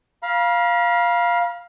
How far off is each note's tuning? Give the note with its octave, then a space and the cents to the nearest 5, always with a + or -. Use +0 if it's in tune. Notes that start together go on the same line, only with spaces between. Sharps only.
F5 +0 B5 -45